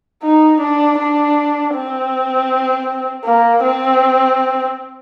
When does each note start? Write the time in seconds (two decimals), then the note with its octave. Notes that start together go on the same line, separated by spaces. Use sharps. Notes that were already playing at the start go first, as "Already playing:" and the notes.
0.23 D#4
0.60 D4
0.98 D4
1.74 C4
3.24 A#3
3.63 C4